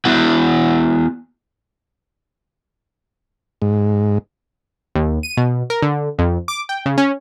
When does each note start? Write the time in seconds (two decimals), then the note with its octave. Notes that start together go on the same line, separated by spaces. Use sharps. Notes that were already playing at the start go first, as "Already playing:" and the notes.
0.05 B3 E4 F#4 F#5
3.62 G#2
4.95 D#2
5.23 D#7
5.37 B2
5.70 A#4
5.82 D3
6.19 F2
6.48 D6
6.69 G5
6.86 C#3
6.98 C#4